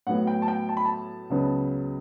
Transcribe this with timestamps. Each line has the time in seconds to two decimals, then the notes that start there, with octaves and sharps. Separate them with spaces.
0.07 A2 F#3 B3 F#5
0.27 G5
0.42 A5
0.48 G5
0.69 A5
0.77 B5
0.85 A5
1.30 C#2 C#3 F#3 B3